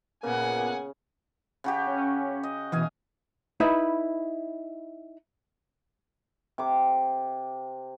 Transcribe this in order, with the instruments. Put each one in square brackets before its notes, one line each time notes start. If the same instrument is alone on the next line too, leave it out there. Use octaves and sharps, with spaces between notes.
[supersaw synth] A#2 B3 [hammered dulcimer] C#3 [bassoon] A#3 [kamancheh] F#5 G#5
[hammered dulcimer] C#3 F#4 G4
[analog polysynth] C#4
[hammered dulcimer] D#5
[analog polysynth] B2 E3 [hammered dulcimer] D#5 F5 G#5
[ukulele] D#4 E4 B4
[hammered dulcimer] C3 D6